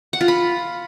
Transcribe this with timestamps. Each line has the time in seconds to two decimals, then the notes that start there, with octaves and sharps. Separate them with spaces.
0.13 F#5
0.21 F4
0.28 B5